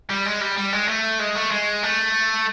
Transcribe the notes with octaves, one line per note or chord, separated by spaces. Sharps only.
G3
G#3
G3
G3
G#3
A3
G#3
A3
G#3
A3